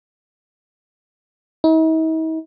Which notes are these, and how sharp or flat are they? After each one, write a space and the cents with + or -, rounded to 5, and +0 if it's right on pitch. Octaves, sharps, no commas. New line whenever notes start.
D#4 +45